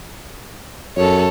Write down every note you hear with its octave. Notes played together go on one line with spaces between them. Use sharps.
F#2 A4 C#5